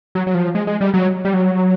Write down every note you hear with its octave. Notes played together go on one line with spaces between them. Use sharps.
F#3
F#3
F3
G#3
G#3
G3
F#3
G3
F#3